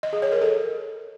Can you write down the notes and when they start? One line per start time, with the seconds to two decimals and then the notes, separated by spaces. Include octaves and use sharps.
0.03 D#5
0.13 G#4
0.22 C#5
0.32 A#4
0.42 A4